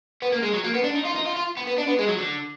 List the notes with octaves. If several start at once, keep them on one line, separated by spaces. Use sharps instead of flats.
B3
A#3
G#3
F#3
A#3
B3
D4
D#4
F4
D#4
F4
F4
B3
B3
D4
B3
G#3
F#3
D3